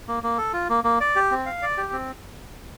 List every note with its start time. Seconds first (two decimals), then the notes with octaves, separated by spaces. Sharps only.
0.08 A#3
0.23 A#3
0.38 A4
0.53 F4
0.69 A#3
0.84 A#3
1.00 D5
1.16 G4
1.31 C4
1.46 F5
1.62 D5
1.77 G4
1.92 C4